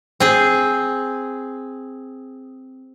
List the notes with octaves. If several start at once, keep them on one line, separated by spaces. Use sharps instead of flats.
C4 G#4